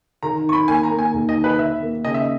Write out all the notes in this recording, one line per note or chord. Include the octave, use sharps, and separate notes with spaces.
D#3 A#5
D#4 C#6
B5
A#3 G#5
A#5
A#3
G#5
D#2
D#5
D#3
B4
D#3 E5
A#3
C#3 D#5
E5